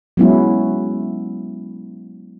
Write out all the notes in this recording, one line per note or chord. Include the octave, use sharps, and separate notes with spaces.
F#3 G#3 B3 C#4 E4